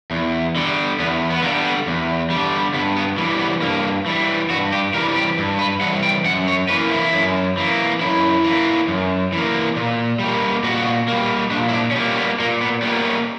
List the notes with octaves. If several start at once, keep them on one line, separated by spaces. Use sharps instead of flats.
E2
D3 G3
E2 B3
B3
D3 G3 A#3
B3
E2
G3
D3
G2 B3
B3
E3 G3 A#3
B3
G2 A#3
E3 G3
G2 F#4
G4
E3 G3 A#4
G4
G2
B4
E3 G3 F#5
G5
F#2 F#5
C#5
E3 A#3 B4
E4
F#2
E3 A#3
F#2 E4
E3 A#3
F#2
E3 A#3
A#2
G3 A#3
A#2 F#4
G3 A#3
A#2 D4
E4
D4
C#4
G3 A#3 B3
C#4
B3
A#2 A#3
B3
G3 A#3 B3
B3
C#4